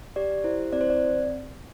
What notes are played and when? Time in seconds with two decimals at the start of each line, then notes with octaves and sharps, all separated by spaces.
0.16 G4 D5
0.44 E4 C5
0.73 C4 D5
0.81 C5
0.90 D5